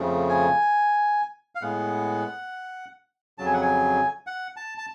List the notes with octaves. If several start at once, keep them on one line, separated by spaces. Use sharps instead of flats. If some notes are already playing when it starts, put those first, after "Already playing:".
Already playing: F2 C#3 F3 A3
G#5
F5
A2 G#3 B3 F#5
F2 C#3 F#3 A5
G#5
F#5
G#5
F#5
A5
A5